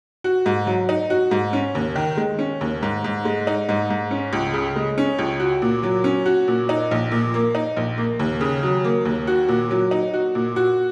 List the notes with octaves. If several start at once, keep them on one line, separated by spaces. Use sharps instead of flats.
F#4
G#2
F#3
D#4
F#4
G#2
C#4
D#2
D#3
G#3
C#4
D#2
G#2
G#2
G#3
D#4
G#2
G#2
C#4
C#2
C#3
G#3
C#4
C#2
F#4
A#2
F#3
C#4
F#4
A#2
D#4
A#1
A#2
A#3
D#4
A#1
A#3
D#2
C#3
F#3
A#3
D#2
F#4
A#2
F#3
D#4
F#4
A#2
F#4